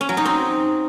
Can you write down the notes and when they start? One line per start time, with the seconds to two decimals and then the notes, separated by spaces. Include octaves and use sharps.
0.01 C#4
0.09 F#3
0.17 D#4
0.25 C4